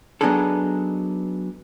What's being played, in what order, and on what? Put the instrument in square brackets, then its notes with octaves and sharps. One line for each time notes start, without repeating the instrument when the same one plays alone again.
[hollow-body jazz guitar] F#3 B3 D4 D#4 G#4 A4